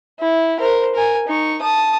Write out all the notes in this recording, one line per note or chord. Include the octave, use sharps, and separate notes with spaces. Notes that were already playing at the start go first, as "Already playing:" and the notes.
E4
A#4 C5
A#4 G#5
D#4 C#6
A5 D#6